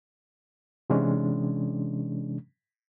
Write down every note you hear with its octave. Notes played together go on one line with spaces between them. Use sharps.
C3 E3 G#3 C#4 D4